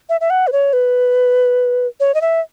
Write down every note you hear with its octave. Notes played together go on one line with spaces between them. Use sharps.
E5
E5
F#5
B4
C#5
B4
C#5
D#5
E5